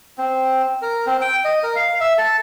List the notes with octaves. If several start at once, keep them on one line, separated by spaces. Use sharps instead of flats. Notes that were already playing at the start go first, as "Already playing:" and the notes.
C4
A#4
C4
G5
D#5
A#4
F5
E5
A4